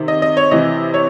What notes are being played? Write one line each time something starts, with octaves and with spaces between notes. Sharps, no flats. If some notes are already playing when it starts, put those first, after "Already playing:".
Already playing: C3 D#3
D#5
D#5
C#5
C3 E3 D#5
C#5